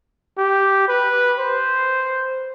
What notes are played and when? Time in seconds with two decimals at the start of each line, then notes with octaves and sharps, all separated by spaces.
0.38 G4
0.88 B4
1.39 C5